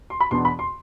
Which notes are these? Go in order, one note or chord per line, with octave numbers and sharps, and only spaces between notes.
C6
B5
E2 B2 B3 D4 C6
B5
C6